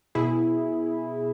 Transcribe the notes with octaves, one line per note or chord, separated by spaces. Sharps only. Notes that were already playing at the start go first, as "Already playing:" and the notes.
B2 E4 G#4